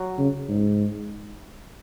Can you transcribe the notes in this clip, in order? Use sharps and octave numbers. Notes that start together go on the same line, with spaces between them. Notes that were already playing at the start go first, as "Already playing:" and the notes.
Already playing: F#3
C#3
G#2